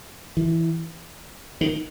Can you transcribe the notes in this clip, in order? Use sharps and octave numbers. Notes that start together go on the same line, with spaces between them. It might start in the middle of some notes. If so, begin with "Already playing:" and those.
E3
D#3